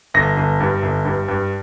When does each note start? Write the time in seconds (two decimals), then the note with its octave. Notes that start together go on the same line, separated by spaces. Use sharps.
0.14 G1 A#6
0.37 G1
0.60 G2
0.83 G1
1.05 G2
1.28 G2